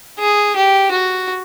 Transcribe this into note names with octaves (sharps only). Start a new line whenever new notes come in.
G#4
G4
F#4